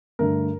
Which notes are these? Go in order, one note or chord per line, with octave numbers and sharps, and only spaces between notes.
G2 D3 A3 A#4